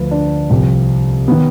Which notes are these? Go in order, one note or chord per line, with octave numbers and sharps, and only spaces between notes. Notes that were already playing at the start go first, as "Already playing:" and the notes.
Already playing: D2 D3 F3 B4
D4
C2 C3 F3 C4
D#3 B3